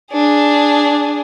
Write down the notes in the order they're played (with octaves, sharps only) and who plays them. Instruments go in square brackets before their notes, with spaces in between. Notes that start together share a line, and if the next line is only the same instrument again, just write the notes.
[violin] D4 G#4